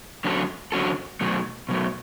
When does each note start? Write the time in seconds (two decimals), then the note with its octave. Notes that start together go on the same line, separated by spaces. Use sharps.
0.25 D3 F#3 C#4 F#4 A4
0.72 D3 F#3 C#4 F#4 A4
1.21 B2 F#3 A3
1.69 B2 F#3 A3